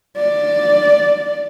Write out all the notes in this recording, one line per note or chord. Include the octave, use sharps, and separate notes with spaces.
D5